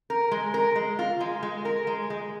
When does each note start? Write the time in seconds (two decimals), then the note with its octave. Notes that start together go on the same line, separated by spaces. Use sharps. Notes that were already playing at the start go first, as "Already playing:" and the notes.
0.10 A#4
0.31 G#3
0.54 A#4
0.76 G#3
0.99 F4
1.20 G#3
1.43 G#3
1.65 A#4
1.87 G#3
2.10 G#3